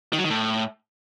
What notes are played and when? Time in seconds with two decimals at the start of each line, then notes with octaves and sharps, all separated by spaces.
0.13 D#3
0.19 F#3
0.24 D#3
0.30 A2